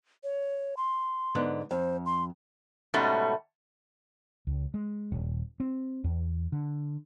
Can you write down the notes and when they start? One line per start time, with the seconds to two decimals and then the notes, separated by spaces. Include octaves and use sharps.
0.24 C#5
0.77 C6
1.35 G#2 D3 B3
1.71 F2 C5
2.06 C6
2.94 G#2 B2 G3 A3 C#4
4.47 C#2
4.74 G#3
5.12 D#1
5.60 C4
6.04 E2
6.52 D3